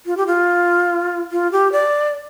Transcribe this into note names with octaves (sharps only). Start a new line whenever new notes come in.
F4
G4
F4
F4
G4
D5